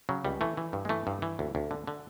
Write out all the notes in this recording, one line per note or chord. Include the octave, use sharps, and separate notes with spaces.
C#3 F#3
C#2 G3
E3 A3
E3
G2
G#3
E3 A3
G2
E3
D2
D2
D3
D3